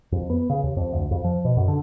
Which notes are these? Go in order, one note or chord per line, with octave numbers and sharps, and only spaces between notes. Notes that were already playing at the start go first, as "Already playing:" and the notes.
F2
B3
C#3
D#2
F2
D2
F2
F3
B2
F#2
D3